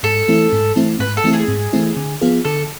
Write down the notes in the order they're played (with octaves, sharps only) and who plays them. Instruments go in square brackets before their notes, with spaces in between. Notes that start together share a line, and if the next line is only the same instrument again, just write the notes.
[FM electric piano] G#2 [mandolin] A4
[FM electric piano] E3 A3 C4 E4
G#2
E3 A3 C4 E4
[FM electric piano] G#2 [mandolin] B4
[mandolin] A4
[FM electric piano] E3 A3 C4 E4
[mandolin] G#4
[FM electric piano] G#2
E3 A3 C4 E4
D3
F3 B3 F4 G#4
[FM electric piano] D3 [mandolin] A4